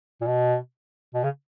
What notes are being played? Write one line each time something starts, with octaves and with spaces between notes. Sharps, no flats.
A#2
B2
B2
C#3